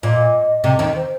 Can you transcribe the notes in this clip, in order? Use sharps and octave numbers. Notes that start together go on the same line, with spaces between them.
A#2 D#5
C3 D#5
D#2 D#3 D#5
C5